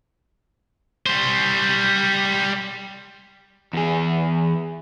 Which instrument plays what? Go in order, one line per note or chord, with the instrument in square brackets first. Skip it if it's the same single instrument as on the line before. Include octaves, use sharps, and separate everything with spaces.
[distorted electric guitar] G3 C5
[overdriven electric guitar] E2 G#4